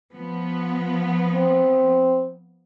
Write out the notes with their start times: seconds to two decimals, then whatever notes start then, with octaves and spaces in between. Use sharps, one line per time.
0.14 F3 B3
1.34 C4